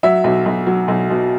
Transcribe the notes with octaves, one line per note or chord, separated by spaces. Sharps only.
F#3 E5
B1
B1
F#3
B1
B2